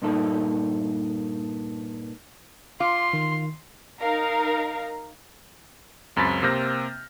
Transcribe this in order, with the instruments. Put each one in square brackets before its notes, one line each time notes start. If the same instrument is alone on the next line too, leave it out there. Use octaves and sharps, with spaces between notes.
[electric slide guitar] G2 A#2 D#4 A4
[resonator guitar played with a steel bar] F4 [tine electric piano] F5 D6 [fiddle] C6
[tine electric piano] D#3
[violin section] D#4 A#4 F5 A#5
[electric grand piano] C#2 F#2 C4 B5 A6 B6
C3 A#3 C4 F6 G6 A#6